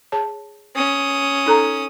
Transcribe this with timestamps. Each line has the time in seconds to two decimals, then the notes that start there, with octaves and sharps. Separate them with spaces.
0.12 G#4 C#5 A5
0.75 C#4 D#6
1.46 D#4 A4 A#5